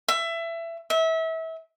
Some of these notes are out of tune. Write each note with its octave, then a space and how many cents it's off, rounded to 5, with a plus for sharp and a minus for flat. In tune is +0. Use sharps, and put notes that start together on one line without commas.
E5 +20
E5 -30